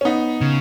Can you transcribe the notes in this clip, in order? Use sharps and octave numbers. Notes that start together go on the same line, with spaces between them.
C#4
B3 D#4
C#3